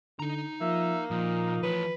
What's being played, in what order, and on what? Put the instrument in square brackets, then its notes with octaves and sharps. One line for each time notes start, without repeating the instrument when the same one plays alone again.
[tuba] D3 [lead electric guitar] D#4 A#5
[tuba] F3 [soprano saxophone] A#3 [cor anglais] E5
[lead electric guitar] A#2 [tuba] F3 [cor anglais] D#4
[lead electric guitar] E3 C#5 [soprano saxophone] B4